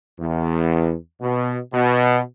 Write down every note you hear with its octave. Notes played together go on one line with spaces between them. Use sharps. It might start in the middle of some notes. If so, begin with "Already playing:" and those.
E2
B2
B2